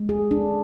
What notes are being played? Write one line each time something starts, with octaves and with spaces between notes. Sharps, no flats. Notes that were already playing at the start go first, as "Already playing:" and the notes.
Already playing: G#3
G#4
D4